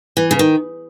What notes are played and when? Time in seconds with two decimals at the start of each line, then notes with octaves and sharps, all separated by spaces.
0.17 E3
0.31 C#3
0.39 D#3